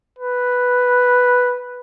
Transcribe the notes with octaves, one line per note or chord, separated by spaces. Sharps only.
B4